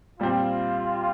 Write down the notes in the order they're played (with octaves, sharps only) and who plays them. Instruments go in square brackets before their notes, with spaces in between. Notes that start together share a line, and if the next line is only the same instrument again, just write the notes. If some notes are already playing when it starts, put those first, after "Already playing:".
[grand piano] A#2 G3 C4 [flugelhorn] F4